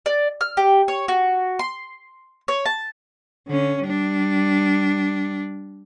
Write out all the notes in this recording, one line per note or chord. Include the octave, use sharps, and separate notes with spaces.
D5
F6
G4
C#5
F#4
C6
C#5
A5
D3 C#4
G3 D4